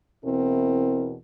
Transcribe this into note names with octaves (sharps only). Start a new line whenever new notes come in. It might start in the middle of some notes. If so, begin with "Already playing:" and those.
E2 B2 C4 E4 A#4